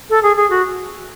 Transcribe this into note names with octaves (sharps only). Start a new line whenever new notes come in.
A4
G#4
G#4
F#4